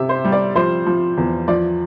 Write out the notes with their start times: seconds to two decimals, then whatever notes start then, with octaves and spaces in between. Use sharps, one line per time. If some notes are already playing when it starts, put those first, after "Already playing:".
Already playing: C3 E5
0.09 C5
0.25 G3
0.32 D5
0.55 F3 C5
0.87 F3
1.17 E2
1.48 F3 D5